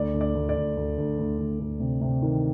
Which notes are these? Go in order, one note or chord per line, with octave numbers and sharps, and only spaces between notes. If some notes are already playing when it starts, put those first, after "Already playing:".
Already playing: D2 D5
D2
D5
D2
D5
D2
D2
D2
D2
D2
D2
C3
C3
D#3